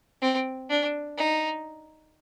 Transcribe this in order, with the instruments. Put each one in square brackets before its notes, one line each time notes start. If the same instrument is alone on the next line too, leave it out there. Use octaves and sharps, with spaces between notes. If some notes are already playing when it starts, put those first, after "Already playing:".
[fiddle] C4
D4
D#4